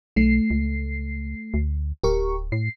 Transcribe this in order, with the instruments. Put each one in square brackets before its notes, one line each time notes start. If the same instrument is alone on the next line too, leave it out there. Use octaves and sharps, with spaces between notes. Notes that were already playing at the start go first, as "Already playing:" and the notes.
[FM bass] B1 [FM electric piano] A3 C7
[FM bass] C#2
D2
[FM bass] D1 [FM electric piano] G4 A#4 C#6
[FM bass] A2 [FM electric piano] C7